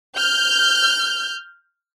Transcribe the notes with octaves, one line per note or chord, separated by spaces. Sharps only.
F6 G6